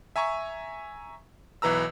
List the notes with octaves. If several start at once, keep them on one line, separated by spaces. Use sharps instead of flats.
E5 G#5 A#5 C#6
B1 E3 B4 A#5 E6